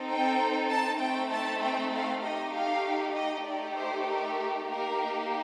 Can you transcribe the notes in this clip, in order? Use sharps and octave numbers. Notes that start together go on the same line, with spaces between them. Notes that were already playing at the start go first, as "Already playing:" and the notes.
Already playing: C4 D#4 A4
G5
A5
A3 C4 D#4 G5
A5
G5
F5
A3 D#4 G4 D#5
F5
D#5
A3 D#4 G4 D5
C5
A#4
A#3 D#4 G4 A#4